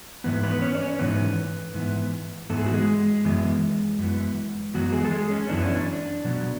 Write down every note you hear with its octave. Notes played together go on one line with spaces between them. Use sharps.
G#2 E3 B3 B4
B3 B4
C#4 C#5
D5
C#4 C#5
G#2 E3 B3 B4
G#2 E3 B3
G#2 E3 B3 A4
G#4
F#4
G#3 G#4
F#2 E3 B3
F#2 E3 B3
F#2 E3 F#3 B3 F#4
G#3 G#4
A4
G#3 G#4
C#4
F#2 E3 B3 D4
C#4
D4
B2 F#3 B3